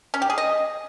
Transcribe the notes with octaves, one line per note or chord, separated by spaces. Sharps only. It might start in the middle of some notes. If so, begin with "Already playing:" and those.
C#4
G4
G#4
D#5